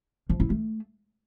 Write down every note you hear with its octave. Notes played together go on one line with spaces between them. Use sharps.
F3
E4
A3